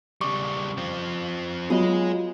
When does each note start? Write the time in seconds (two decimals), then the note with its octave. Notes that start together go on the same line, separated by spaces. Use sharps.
0.21 C#3 G3 C#6 D6
0.78 F3 C4
1.70 F#3 B3 F4 G#4 D#5